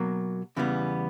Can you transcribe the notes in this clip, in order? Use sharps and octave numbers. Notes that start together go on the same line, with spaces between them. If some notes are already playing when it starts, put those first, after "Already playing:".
Already playing: B2 F#3 A#3
E2 C#3 E3 G3 B3